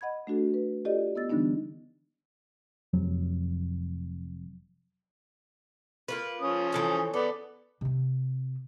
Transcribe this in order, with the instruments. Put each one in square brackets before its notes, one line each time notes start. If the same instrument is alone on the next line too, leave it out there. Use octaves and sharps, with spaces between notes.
[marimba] D#5 F#5 B5 G#6
A3 D4 F#4 A4
B4
F4 G4 A4 D5 D#5
B3 D#5 E6 A6
D3 E3 G3 B3 D4 D#4
[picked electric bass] F1 F2 F#3
[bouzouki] A#3 F4 B4
[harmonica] F3 C#4 D#6
[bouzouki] E3 A4 C5
[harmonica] B3 D5 [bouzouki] A4
[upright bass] C3 C4